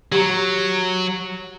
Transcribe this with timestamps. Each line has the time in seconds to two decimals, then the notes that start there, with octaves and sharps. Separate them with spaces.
0.12 F#3 G4 A#5 B5